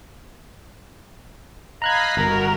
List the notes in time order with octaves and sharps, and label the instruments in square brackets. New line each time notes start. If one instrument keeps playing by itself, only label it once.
[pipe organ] D#5 F5 B5 [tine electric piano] A#5 F#6 G#6
[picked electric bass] G1 [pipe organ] F#4 [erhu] A#4